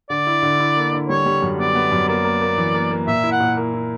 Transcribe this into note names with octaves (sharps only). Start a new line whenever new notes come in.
D3 D5
E4
D3
E4
A#3
D3
G3 C#5
G3
F#2
B3 D5
B3
F#2
A#3 D5
A#3
A#3
E3
A#3
A#3
A#2 E5
E4
F#5
A#2
A#3
E4